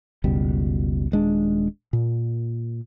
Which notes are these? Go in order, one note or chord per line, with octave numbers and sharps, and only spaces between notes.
F#1 C#2 B2 G3
D#1 G#3 D4
A#2